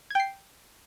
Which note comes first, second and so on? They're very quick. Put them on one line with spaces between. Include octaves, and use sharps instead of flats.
G#6 G5 C7